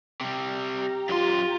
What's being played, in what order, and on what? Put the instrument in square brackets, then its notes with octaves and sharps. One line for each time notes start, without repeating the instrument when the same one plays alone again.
[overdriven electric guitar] C3 G3
[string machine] G4 A#5
[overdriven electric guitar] F#2 C6 [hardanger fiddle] F4